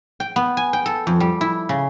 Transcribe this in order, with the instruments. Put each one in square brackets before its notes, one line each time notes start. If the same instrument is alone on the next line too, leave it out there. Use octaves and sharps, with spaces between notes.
[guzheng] G5
B3
G#5
G5
A4
F2
G3
E4
C#3